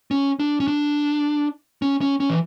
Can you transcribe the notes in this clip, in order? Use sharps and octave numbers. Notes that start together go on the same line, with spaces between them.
C#4
D4
C#4
D4
C#4
C#4
C#4
E3